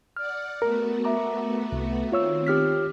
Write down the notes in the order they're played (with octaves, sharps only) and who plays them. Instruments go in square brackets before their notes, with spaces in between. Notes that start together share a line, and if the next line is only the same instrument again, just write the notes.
[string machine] D5 F#5 [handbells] F6
[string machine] A3 B3 F#4 [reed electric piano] A#4
[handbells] E5 A#5 D6
[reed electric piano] C2
[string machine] D#3 C4 [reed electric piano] F4 C#5 E6
[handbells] G4 F6 B6